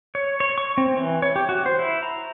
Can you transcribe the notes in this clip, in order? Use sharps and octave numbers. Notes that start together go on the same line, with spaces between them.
C#5
C#5
C#6
C4
E3
C#5
G4
F#4
C5
E4
A#5